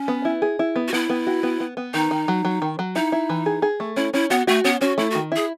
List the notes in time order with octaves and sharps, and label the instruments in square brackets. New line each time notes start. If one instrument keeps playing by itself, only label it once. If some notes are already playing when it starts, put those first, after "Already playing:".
Already playing: [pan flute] C#4
[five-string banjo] B3
E4
G#4
E4
B3
[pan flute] F#4
[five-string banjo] B3 [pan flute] E4
[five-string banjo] B3
F#4
B3
B3
B3
[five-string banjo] D#3 [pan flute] D#4
[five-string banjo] D#3
F#3
F#3
D#3
F#3
[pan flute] D#4 [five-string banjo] E4
[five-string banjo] E4
E3
G#4
G#4
A3
[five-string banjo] C#4 [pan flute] E4
[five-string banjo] C#4 [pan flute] E4
[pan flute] B3 [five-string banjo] F#4
[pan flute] A3 [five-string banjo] F#4
[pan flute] B3 [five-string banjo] C#4
[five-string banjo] C#4 [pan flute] F#4
[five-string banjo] A3 [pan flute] E4
[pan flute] F#4
[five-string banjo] D#3
[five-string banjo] E4 [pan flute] G#4